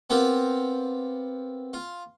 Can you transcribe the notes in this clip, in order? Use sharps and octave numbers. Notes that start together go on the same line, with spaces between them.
B3 C4 F4 G4 A#4
F4